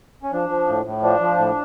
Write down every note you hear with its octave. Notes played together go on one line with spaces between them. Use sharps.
C#4
F3 D4
F3
A2
A2
F3 D4
F3
A2